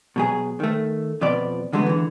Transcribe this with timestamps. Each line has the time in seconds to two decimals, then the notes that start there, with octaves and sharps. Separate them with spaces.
0.16 B2 F#3 G#4
0.60 D#3 A3
1.21 F2 B2 F3 B3 D5
1.73 E2 D3 F#3 G#3 A3 B3
1.86 D3 E3